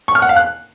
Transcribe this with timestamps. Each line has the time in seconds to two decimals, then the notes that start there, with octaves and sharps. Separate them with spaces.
0.08 C#6
0.15 F6
0.22 F#5
0.29 F5
0.36 F#6